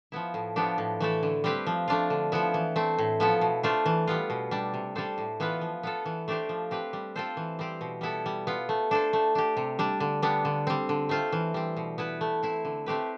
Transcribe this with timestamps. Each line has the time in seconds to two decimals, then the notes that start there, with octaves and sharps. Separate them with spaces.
0.12 F3 B3 E4
0.34 A2
0.56 F3 B3 D4 G4
0.78 A2
1.01 E3 A3 E4 A4
1.23 D3
1.44 G3 C4 G4 B4
1.67 F3
1.88 A3 D4 F4
2.10 D3
2.32 F3 B3 E4
2.54 E3
2.76 A3 C4
2.98 A2
3.20 F3 B3 E4 A4
3.41 B2
3.63 A3 D4 F4 C5
3.86 E3
4.07 G3 B3 F4
4.30 B2
4.51 G3 D4
4.74 C3
4.95 G3 D4 A4 C5
5.18 A2
5.40 E3 B3 F4 B4
5.61 F3
5.83 B3 F4 A4
6.05 E3
6.28 A3 D4 G4 C5
6.49 F3
6.71 C4 G4 B4
6.93 G3
7.16 C4 F4 A4 C5
7.37 E3
7.59 G3 C4 G4
7.81 B2
8.01 G3 B3 E4 A4
8.26 G3
8.47 B3 F4
8.69 A3
8.91 D4 A4 C5
9.13 A3
9.35 D4 G4
9.57 C3
9.79 G3 D4
10.00 D3
10.22 G3 B3 D4
10.45 D3
10.67 G3 C4
10.89 D3
11.09 A3 C4 F4 C5
11.32 E3
11.54 G3 C4
11.77 B2
11.98 B3 E4 B4
12.21 A3
12.43 C4 E4
12.65 D3
12.86 A3 C4 G4 B4